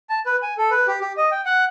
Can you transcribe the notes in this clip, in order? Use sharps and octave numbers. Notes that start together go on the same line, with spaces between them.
A5
B4
G#5
A4
B4
G4
G4
D#5
G5
F#5